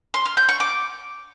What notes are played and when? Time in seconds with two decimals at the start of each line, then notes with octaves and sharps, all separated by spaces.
0.14 C6
0.26 F6
0.37 G6
0.49 C#6
0.60 D6